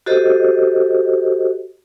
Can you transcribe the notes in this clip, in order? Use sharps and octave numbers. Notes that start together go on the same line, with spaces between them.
F#4 G4 A4 C5 D#5